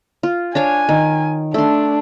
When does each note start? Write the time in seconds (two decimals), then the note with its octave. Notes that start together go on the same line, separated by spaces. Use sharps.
0.23 F4
0.55 D4 C#5 F5 G#5
0.89 D#3
1.54 A3 D4 C6